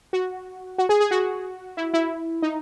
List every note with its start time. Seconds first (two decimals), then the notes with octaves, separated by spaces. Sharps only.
0.13 F#4
0.78 F#4
0.89 G#4
1.00 G#4
1.11 F#4
1.77 E4
1.94 E4
2.42 D#4